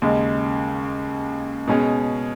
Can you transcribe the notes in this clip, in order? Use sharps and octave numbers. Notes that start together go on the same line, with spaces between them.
D#2 C#3 G#3
B2 G#3 C#4 G#4